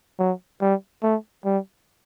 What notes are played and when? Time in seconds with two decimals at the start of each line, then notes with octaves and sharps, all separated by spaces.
0.19 F#3
0.62 G3
1.03 A3
1.45 G3